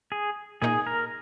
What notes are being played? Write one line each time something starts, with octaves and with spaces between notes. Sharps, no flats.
G#4
A#2 A#3 D#4 G#4
A#4